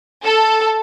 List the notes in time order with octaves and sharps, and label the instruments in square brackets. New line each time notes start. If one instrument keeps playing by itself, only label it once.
[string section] A4